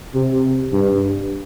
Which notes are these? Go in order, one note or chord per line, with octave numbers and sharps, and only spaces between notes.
C3
G2